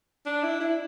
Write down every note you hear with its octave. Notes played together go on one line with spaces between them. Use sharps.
D4
E4
E4